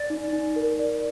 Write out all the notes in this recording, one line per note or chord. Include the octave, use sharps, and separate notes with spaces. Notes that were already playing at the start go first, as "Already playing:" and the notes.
Already playing: D5 A6
D#4
D#4
A#4
D5